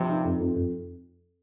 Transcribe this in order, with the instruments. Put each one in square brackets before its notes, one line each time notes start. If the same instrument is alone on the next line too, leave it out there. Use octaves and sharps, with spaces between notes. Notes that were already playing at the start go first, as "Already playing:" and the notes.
Already playing: [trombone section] G2 C3 [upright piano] F3
[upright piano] D#4
F2
F2
F2